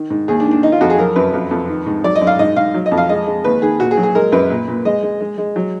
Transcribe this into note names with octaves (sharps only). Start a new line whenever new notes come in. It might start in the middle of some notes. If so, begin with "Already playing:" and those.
Already playing: D#3
G#2
D#2 G#4
D4
D#3
D4
D#3 D#4
F4
F2 F#4
G#4
F#3 A#4
F#2 B4
F2
F2
D#3
G#2
F#3 D5
D#5
F#2
F5
G#2 D#5
G#2 F5
F#3
D#5
F2
F5
G#3 D#5
G#3
D#2 B4
D#3 G#4
A#2 F#4
G#4
F#3
G#4
G#3 A#4
F#2 B4
A#2
A#2
G#3 D#5
G#3
G#3
G#3
F#3